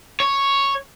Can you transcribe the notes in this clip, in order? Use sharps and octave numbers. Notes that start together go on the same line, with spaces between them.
C#5